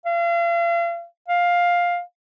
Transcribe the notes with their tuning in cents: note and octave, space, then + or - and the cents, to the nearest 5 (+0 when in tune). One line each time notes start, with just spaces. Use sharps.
F5 -40
F5 +10